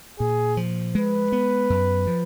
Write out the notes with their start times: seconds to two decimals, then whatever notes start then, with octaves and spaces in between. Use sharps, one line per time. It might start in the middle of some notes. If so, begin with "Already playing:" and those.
0.19 A#2 G#4
0.57 F3
0.95 G#3 B4
1.32 B3
1.70 F#2
2.07 F3